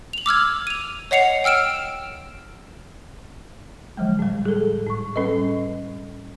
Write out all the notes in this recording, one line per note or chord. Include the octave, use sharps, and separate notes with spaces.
F7 F#7
D6 E6 F6 G#6
D#7 F7
C#5 D#5 F#5 C7 C#7 F7
G5 E6 F6 D7 E7
D3 F3 F#3 G#3
A2 G3
G#4 A4
A2 C#6
G3 C#4 A4 B4 D#5